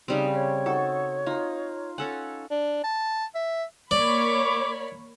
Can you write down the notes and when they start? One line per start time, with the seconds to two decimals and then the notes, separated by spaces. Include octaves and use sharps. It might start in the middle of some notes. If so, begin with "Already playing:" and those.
0.08 C#3 G3 C4 D#4
0.33 C#5
0.66 D#4 F#4 A4
1.26 D#4 F4 A#5
1.98 C#4 A4 F#5 G#5
2.51 D4
2.84 A5
3.35 E5
3.91 A#3 C#5 D5 B5 D6